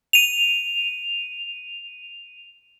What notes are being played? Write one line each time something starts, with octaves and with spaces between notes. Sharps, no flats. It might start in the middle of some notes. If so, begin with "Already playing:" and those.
D#7 F7